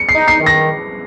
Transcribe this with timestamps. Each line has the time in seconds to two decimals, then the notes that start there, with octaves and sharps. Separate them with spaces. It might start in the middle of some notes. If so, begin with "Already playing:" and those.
Already playing: C#7
0.09 C7
0.15 D#4
0.28 C7
0.41 D#3
0.46 A#6